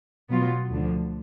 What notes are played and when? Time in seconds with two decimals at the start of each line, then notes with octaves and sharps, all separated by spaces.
0.29 B2 F#3 B3 F4
0.70 D2 D3 F3